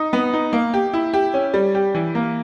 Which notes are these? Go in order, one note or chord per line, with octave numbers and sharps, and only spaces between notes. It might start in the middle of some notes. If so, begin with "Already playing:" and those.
Already playing: D#4
B3
D#4
A#3
G4
E4
G4
C#4
G3
G4
E3
A#3